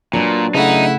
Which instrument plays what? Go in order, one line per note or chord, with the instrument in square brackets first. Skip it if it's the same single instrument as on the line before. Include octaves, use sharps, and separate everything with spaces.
[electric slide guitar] A#2 [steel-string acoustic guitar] F#3 D4 B4
[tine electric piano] C#3 A3 [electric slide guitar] D#4 [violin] E4 F#5